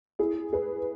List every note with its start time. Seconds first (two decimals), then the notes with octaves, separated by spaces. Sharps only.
0.19 E4 G#4
0.53 G#4 B4